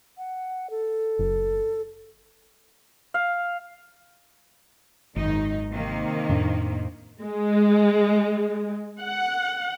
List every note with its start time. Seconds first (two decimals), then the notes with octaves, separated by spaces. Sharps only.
0.18 F#5
0.70 A4
1.19 F#1
3.14 F5
5.16 G#1 F#2 D#3 D#4
5.70 C3 D#3 A#3
6.29 F2 A2 D4
7.21 G#3
9.00 F#5